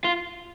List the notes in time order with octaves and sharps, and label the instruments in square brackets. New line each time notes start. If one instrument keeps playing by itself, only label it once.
[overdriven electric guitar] F4